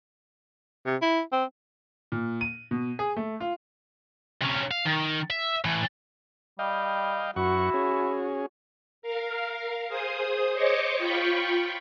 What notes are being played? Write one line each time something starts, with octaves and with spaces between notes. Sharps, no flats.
C3
E4
C4
A#2
D#7
B2
G#4
A3
F4
C3 C#4
F5
D#3
E5
A2 E3
G3 D#5 F5 G5
F#2 E4 F#4 F#5 C#6
C#4 G#4
A#4 F5
G#4 C5 D#6
C5 C#5 D#5 C#6 D6
F4 G5 B5 C#6